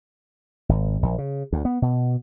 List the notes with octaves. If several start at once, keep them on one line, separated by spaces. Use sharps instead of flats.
G#1
A#1
C#3
D2
B3
B2